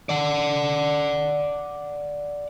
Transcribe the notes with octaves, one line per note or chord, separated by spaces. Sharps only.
D5 F#5